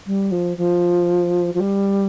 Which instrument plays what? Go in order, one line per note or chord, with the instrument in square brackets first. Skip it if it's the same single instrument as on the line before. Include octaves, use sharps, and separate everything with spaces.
[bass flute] G3
F3
F3
F3
G3